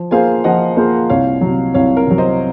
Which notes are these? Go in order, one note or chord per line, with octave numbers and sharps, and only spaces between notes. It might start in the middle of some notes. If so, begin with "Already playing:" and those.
Already playing: F3
A#3 F4 G#4 C5 F5 G#5
F3 D#5 F#5
A#3 F4 G#4 C5
C2 C#5 F5
C3 F#3
C2 C#5 F5
A#4
C3 F#3
C5 D#5